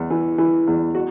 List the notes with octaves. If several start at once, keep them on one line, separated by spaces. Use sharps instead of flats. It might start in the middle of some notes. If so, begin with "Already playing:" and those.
Already playing: E2
E3
E3
E2
F#4